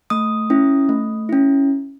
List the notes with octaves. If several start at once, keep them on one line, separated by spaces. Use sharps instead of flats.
A3 D#6
C#4 E4
A3
C#4 E4